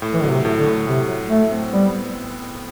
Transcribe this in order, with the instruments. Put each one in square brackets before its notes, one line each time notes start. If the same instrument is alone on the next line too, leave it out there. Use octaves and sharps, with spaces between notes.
[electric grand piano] A2
[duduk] E3
[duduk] D3 [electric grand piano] F#3
[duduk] C3
[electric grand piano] A2
[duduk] D3
[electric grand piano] A2
[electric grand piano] A2 [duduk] C3
[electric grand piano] F#3
[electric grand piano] A2 [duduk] A3
[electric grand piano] C4
[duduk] G3 [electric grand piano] B3